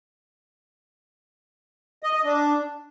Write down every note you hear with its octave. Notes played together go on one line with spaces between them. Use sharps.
D#5
D#5
D4